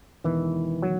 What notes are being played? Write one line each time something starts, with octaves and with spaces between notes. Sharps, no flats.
E1 E2 D#3 E3
F#3